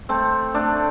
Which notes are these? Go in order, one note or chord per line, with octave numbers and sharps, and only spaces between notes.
A3 C4
A3 D4